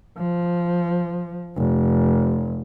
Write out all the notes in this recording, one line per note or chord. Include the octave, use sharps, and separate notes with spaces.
F3
F1